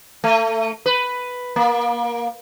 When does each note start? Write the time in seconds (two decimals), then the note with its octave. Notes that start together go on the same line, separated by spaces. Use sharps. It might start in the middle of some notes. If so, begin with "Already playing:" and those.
0.24 A3
0.86 B4
1.56 A#3